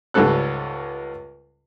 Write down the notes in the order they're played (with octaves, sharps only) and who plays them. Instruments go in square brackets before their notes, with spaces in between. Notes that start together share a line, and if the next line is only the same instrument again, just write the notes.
[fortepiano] C#2 G#2 G3 C#4 A4 F#6